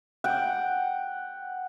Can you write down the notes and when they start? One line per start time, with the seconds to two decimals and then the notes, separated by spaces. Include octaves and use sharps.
0.24 F#5 G5